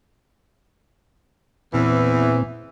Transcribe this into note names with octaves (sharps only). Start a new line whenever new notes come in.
E2 A#2 E3 C4